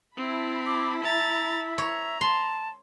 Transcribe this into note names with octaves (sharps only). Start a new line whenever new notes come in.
C4 E4 A5 B5
D6
E5 A#5 A6
C#5 A#5
A5 C6